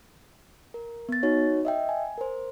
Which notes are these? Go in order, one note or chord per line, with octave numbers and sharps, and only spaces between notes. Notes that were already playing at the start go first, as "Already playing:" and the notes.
A#4
B3 A6
D#4 F#4 C#5
D#5 E5 G5
G#5
A#4 C5